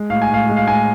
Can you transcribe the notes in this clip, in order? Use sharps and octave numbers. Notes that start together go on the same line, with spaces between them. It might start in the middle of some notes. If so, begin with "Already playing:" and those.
Already playing: G#3
A2 F5
G#5
A2 F5
G#3
F5
A2 G#5